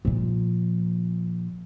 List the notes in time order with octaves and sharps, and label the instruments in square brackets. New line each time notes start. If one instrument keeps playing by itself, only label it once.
[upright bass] A#2 F3